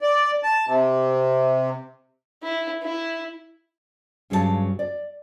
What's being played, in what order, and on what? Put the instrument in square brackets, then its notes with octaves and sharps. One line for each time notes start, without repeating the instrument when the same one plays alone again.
[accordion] D5
A5
C3
[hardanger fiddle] E4
E4
[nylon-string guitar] G2 C#3 F#3 G3 G4 A5
D5